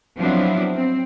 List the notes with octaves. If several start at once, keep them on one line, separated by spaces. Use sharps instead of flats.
F3 F#3 B3 C4 D4 E4
C4